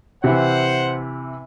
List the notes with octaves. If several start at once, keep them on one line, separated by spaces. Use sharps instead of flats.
C3 E3 C5 F#5